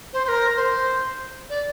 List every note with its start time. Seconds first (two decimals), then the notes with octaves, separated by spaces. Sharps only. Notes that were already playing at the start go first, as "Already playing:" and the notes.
0.13 C5
0.25 C5
0.28 A#4
0.56 C5
1.50 D5